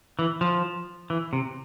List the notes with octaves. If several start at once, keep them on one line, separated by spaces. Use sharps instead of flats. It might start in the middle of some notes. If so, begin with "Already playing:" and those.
E3
F3
E3
C3